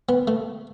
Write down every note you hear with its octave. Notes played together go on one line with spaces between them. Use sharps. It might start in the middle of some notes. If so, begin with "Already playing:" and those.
B3
A3